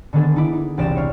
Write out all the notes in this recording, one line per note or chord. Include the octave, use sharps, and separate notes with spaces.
D3 D#3 B3 D4 G#4 A4
D#4 E4 D6
D#4
E1 C2 D5 A#6 E7
C#5 F5